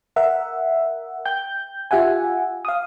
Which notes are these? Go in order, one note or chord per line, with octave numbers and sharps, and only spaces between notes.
A#4 E5 F#5
G5 G6
F4 G4 E5 F#5 G#5
F5 D#6